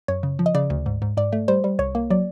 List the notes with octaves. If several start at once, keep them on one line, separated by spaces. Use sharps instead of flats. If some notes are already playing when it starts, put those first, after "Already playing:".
F#2 C#5
C#3
F3
D#5
C#3 D5
D2
G#2
G#2
G#2 D5
A3
G3 C5
G3
C2 C#5
A#3
F#3 D5